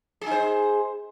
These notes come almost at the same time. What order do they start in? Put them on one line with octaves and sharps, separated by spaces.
G#4 D#4 C5